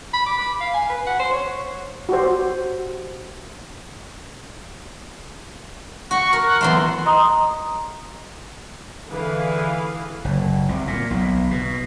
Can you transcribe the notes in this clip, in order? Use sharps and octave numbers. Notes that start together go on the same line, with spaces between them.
B5
D6
B5
F5
G#5
B4
F#5
C5
C#5
F#4 G4 C5
F#4 C#6
A#4
F#5
E2 F#3 A3 C6
D#5 A#5 C6 D#6
D3 E3 G#4 B4 F5
F#1
C2
A#2
B1
B2